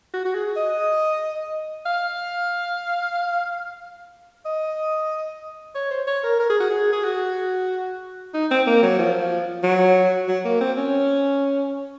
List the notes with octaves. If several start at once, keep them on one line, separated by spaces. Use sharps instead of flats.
F#4
F#4
G#4
D#5
F5
D#5
C#5
C5
C#5
A#4
A#4
G#4
F#4
G#4
G#4
F#4
D#4
C4
A#3
F#3
F3
F#3
F#3
A#3
C4
C#4